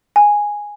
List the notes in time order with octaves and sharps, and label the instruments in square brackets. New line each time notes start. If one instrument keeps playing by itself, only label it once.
[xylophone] G#5